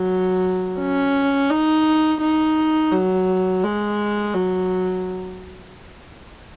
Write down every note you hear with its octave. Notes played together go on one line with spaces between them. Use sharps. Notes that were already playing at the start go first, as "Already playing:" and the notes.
Already playing: F#3
C#4
D#4
D#4
F#3
G#3
F#3